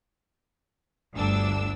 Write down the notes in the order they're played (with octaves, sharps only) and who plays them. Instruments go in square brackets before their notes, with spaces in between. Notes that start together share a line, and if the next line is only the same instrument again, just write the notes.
[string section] G1 D2 D4 E6